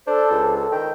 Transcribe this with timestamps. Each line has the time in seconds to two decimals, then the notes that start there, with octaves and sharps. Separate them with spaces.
0.07 D4 A4 C5
0.31 C#2
0.72 D#3 G5